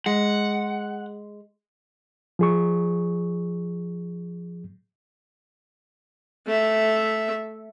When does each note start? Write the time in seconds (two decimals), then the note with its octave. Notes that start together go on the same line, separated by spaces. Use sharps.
0.06 G#3 F#5
2.39 F3 G#4 C#6
6.47 A3 E5